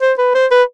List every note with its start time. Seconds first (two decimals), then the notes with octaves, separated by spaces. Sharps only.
0.02 C5
0.18 B4
0.35 C5
0.51 B4